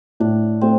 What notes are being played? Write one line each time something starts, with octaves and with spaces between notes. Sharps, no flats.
A2 D4
A3 C4